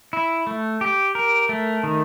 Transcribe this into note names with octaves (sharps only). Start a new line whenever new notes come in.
E4
A3
G4
A#4
A3
D#3